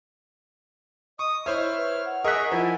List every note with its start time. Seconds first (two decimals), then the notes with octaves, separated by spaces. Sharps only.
1.19 D#5 C#6 D#6
1.46 E4 C5 C#5 E5 F6
1.76 B4
2.05 F#5
2.24 G#4 A#4 D#5 E5 C#6 F#6 B6
2.52 F3 E4 G#5